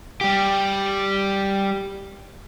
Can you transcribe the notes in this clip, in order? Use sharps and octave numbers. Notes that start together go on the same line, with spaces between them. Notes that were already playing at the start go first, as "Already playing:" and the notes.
G3 G4